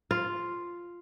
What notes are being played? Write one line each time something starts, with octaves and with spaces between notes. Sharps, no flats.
F4